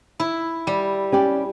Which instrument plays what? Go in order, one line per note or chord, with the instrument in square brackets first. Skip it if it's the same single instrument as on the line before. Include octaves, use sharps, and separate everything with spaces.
[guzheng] E4
G3
[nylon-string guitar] C#4 G4 D5